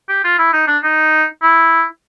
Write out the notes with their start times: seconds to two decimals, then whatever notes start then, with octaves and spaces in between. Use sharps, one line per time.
0.09 G4
0.24 F4
0.39 E4
0.53 D#4
0.67 D4
0.83 D#4
1.42 E4